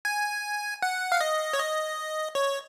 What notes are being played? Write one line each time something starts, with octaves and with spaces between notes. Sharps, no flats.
G#5
F#5
F5
D#5
C#5
D#5
C#5